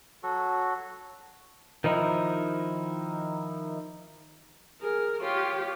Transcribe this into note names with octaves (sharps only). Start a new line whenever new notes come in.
F#3 F#4 A4
D#3 F3 D#4 E4
G#4 A#4
F4 G4 C#5